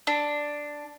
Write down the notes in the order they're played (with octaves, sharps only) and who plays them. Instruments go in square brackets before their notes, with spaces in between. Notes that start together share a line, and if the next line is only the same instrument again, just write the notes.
[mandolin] D4